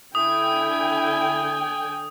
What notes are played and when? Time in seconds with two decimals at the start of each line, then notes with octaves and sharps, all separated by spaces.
0.15 D3 E4 G5 G#5 D#6